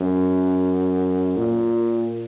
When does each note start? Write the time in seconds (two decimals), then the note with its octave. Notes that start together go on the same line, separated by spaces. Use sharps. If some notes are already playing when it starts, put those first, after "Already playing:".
Already playing: F#2
1.37 A#2